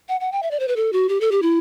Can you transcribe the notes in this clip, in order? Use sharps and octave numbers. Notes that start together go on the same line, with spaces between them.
F#5
F#5
G5
E5
D5
C5
B4
A4
F#4
G4
A4
G4
E4